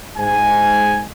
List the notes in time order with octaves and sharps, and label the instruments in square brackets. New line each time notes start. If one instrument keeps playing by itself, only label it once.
[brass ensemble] G#2 G#5